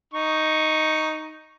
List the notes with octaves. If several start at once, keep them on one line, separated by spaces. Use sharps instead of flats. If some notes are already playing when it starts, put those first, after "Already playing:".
D#4 C#6